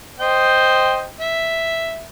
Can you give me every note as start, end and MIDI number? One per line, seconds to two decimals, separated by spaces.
0.20 1.07 72
0.20 1.07 75
0.20 1.07 79
1.20 2.05 76